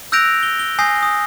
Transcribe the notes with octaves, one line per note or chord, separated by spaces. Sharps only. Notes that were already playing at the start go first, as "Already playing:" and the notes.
E6 F#6 G6 A#6 D7 F7
G7
G7
G#5 D#6 G6 A#6 C7
D#6